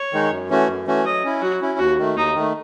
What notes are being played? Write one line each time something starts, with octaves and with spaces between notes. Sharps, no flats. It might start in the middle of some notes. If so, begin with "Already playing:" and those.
Already playing: C#5
D#3 G#3 D#4
F#2
E3 A3 C#4 F#4
F#2
E3 A3 C#4 F#4
F#3 D#5
C#4 E4
F#3 F#4
C#4 E4
D#2 F#4
D#3 A3
D#2 D#4
D#3 A3